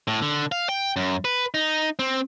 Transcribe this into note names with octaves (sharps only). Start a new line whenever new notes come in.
A2
D3
F5
G5
F#2
B4
D#4
C4